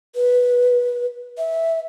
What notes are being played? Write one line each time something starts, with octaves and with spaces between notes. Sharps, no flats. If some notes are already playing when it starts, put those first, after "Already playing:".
B4
E5